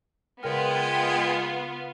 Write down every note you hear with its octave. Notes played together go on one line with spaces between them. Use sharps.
C#3 G#3 B3 F4 A#4 G5 F6